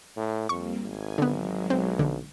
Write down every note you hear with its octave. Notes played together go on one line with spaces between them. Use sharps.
A2
F2 G3 A#3 C4 C#6
G#1 G#5
D3 F#3 G#3 B3
B1 C4
A#1 D3